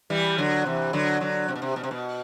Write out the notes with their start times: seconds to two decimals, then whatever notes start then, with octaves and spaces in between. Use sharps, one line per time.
0.10 E3 G3
0.38 D3 F#3
0.66 C3 E3
0.93 D3 F#3
1.21 D3 F#3
1.48 C3
1.56 B2
1.62 C3
1.76 B2
1.84 C3
1.91 B2